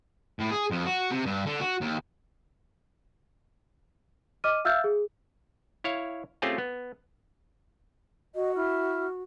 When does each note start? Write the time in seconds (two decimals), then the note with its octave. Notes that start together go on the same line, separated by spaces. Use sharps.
0.39 A2
0.51 G#4
0.71 F2
0.86 F#4
1.11 C3
1.26 G2
1.46 D3
1.61 F#4
1.81 D#2
4.44 D#5 D6 F6 D#7
4.65 E5 F5 E6 F6 G6 A6
4.84 G#4
5.84 E4 C#5 F5
6.42 A3 C4 C#4 F4 G4 G#4
6.58 B3
8.35 F#4 D#5
8.56 E4 F6